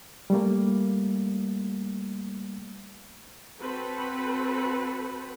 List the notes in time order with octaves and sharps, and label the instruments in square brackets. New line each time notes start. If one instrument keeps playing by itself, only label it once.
[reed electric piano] G3 A3 A#3
[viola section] C4 F#4 A4 B4 B5